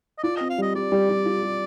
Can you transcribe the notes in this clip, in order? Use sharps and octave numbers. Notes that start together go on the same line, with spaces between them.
D#5
F4 D5
C4 D#5
F5
G3 D#5
G3 D5
G3
G3
F4
G3